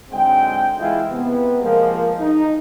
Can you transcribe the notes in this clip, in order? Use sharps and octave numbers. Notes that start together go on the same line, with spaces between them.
G#2 D3 F#3 G#3 C4 G5
E3 G#3 E4 F4
C3 B3
F3 G#3 A#3 A#4
D#4